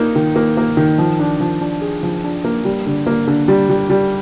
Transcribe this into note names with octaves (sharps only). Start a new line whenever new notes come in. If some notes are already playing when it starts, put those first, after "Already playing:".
Already playing: A#3 D#4
D#3
A#3
A#3
D#3
F3
D4
F3
D4
G#4
F3
D4
A#3
G3
D3
A#3
D3
G3
G3
G3